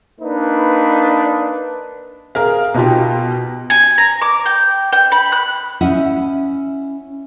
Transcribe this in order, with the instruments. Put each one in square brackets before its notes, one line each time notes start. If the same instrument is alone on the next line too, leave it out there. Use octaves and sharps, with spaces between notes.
[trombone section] A#3 D4 D#4 B4
[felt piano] G#4 A#4 F5
B2 D#4 F4 G4
[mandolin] G#5
A#5
D6
G5
G5
B5
F#6
[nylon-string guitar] C#4 E4 D#5 E5 F#5